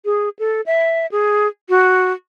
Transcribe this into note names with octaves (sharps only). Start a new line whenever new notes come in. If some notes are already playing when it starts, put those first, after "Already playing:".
G#4
A4
E5
G#4
F#4